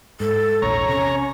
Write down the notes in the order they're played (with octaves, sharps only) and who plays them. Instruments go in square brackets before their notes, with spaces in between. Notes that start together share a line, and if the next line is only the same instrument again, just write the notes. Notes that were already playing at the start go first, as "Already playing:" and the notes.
[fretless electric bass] G#2 [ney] A4
[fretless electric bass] A#1 E2 [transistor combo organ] C#5 A#5
[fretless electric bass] C3 [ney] C#4